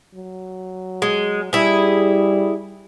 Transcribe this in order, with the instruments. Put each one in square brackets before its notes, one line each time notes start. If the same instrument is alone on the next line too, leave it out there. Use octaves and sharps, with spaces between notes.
[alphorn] F#3
[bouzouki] G#3
[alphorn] G3 [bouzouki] E4 G#4